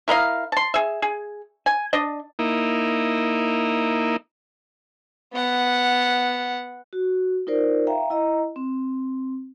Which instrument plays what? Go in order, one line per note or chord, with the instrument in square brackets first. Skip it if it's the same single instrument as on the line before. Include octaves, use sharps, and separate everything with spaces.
[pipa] E4 A#4 D#5 F5
A5 C6
G#4 E5
G#4
G#5
D4 D#5
[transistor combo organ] A#3 D#4 E4
[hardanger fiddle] B3 F#5
[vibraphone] F#4
D#4 F4 A#4 C5 D5
E5 F5 G5 A#5
E4 D#5 A#5
C4